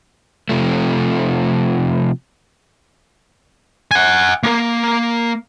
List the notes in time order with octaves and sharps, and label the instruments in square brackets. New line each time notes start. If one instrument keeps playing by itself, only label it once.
[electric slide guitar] C3 F3 A3
[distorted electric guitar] F#5 G#5
A#3 A#4